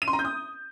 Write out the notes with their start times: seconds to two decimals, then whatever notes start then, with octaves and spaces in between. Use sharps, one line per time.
0.02 D#7
0.07 C6
0.13 A#5
0.19 G6
0.25 D#6